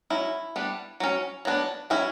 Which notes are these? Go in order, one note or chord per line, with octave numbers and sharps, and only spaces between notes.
F#3 C#4 E4
G3 B3 D4
F#3 C#4
F#3 B3 D4
F#3 C#4 E4